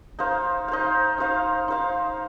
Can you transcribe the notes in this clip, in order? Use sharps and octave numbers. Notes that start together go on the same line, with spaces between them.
D#4 C5 F5
D#4 C5 F5
D#4 C5 F5
D#4 C5 F5